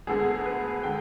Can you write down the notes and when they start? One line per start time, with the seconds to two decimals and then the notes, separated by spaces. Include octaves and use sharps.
0.07 D2 D3 G#3 B3 G#4
0.45 B4
0.83 D3 G#3 G5